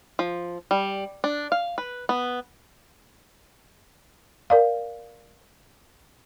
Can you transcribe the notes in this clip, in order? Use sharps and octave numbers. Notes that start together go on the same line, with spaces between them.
F3
G3
D4
F5
B4
B3
A#4 D5 F5